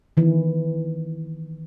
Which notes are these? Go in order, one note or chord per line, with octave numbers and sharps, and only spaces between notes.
D#3 E3